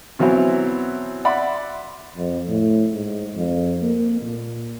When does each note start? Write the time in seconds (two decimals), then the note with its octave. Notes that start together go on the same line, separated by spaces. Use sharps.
0.19 B2 E3 F#3 C4 E4
1.25 D5 E5 F#5 B5 C6
2.16 F2
2.48 A2
2.93 G#2
3.36 F2
3.82 A#3
4.22 A#2